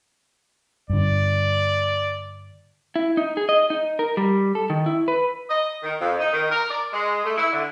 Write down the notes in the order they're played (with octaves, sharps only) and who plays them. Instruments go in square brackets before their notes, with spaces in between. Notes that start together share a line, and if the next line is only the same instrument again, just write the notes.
[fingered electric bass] G2 D3 [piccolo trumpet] D5
[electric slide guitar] E4
D#4
G#4
D#5
D#4
A#4
G3
A4
D#3
E4
B4
[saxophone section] D#5
D#3
F2
D#4
D#3
A#4
D5
G#3
A3
E4
D3